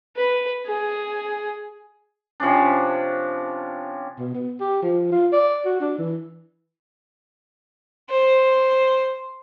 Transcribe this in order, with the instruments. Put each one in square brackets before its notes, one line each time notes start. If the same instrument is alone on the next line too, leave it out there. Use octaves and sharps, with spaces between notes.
[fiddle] B4
G#4
[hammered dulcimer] C3 F3 C#4 D4
[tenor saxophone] B2
B3
G4
F3
F4
D5
F#4
D4
E3
[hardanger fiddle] C5